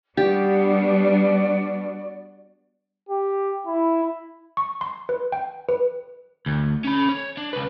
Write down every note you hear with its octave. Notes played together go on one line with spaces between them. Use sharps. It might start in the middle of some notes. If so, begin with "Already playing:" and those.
G3 B3 D4 F#4 G4 D5
G4
E4
C#6
C6
B4
G5
B4
D2
C#4 B5
C#5
D4
C#2 B4